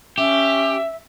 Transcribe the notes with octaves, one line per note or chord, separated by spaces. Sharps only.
C#4 G4 E5